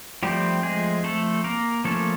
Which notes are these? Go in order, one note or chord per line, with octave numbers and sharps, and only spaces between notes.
F3 G3 A3 C4 G4
G#3 G#4
A3 A4
A#3 A#4
F3 A3 A#3 C#4 A4